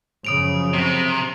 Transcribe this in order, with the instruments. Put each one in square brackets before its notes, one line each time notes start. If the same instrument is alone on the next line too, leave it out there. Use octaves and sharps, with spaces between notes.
[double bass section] F#2 C#3 F3 [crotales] D#6 D7 F7
[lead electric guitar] C3